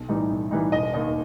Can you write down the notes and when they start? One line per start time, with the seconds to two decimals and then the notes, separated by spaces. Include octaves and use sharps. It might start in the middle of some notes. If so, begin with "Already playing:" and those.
Already playing: B1
0.09 A2 E3 G3 D#4
0.30 B1
0.51 A2 E3 G3 D#4
0.72 E1 D#5
0.94 D#2 D#3 D#5